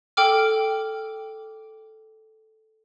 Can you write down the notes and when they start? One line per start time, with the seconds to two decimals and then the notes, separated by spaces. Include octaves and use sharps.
0.17 A4 G5 D6 F6